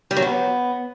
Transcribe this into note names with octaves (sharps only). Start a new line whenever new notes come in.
G3
F#3
B3